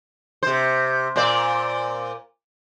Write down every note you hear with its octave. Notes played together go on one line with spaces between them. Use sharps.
C3 C5
A#2 C5 D5